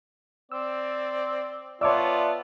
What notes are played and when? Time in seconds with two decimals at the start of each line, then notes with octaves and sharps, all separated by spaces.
0.52 C4 D5 E6
1.81 B3 F4 C#5 D5 E5 A5 D6 E6